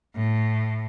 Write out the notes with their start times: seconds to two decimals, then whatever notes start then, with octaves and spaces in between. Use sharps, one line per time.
0.15 A2